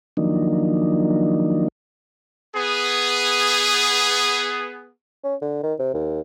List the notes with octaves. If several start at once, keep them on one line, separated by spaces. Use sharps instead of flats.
D#3 F3 F#3 A#3 D4 D#4
B3 G#4
C#4
D3
D#3
C3
D#2